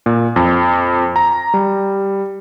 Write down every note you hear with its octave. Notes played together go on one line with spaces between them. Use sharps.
A#2
F2
A#5
G3